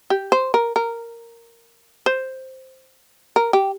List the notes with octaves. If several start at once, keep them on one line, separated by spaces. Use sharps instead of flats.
G4
C5
A#4
A#4
C5
A#4
G4